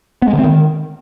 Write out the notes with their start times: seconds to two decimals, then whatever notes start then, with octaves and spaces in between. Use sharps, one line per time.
0.22 B3
0.28 G#3
0.33 D3
0.39 C4
0.44 D#3